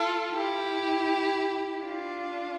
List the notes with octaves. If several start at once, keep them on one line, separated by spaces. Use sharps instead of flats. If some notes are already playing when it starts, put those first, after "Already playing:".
Already playing: F4 A4
E4 G4
D4 F4